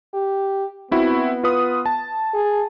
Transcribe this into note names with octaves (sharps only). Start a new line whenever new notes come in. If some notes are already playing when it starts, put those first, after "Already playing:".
G4
B3 C4 E4 F#4
F4 B4 D#6
A5
G#4